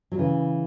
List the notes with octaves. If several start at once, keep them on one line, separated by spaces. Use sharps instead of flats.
F#3
C#3 E3